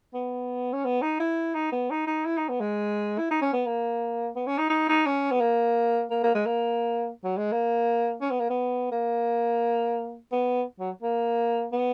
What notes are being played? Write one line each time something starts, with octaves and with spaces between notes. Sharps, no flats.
B3
C#4
B3
D#4
E4
D#4
B3
D#4
D#4
E4
D#4
B3
G#3
E4
D#4
C#4
B3
A#3
B3
C#4
D#4
D#4
D#4
C#4
B3
A#3
A#3
A#3
G#3
A#3
F#3
G#3
A#3
C#4
B3
A#3
B3
A#3
B3
F#3
A#3
B3